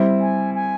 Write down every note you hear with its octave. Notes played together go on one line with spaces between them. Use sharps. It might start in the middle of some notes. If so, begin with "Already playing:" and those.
Already playing: G3 C4 E4
G#5
G#5